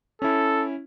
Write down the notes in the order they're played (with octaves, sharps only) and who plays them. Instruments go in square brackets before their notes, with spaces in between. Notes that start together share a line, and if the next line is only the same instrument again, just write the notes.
[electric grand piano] C#4 E4 [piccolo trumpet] A4